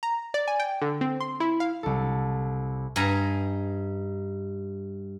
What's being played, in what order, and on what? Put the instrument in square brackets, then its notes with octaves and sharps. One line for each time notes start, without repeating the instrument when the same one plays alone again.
[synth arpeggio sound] A#5
D5
G#5
G5
D3
C4
C6
E4
F5
[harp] C2 A4
[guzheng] G2 D#4 G#5 A#5